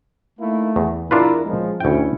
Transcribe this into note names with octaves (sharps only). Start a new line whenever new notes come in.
A3 A#3 D#4 E4
E2 E3
E2 D4 E4 F4 A#4 B4
C#2 F3 G#3
D2 C#4 E4 G5